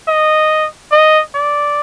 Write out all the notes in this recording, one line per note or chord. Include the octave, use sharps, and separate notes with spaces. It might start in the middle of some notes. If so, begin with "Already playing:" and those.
D#5
D#5
D5